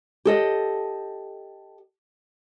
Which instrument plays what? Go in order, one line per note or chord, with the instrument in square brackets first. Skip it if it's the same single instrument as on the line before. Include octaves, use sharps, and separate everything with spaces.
[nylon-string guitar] G4 A4 D#5